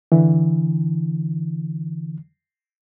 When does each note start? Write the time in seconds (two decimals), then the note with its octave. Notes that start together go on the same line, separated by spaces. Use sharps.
0.12 D3 E3